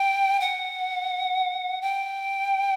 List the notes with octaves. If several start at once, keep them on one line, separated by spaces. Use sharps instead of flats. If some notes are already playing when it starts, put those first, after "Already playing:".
Already playing: G5
F#5
G5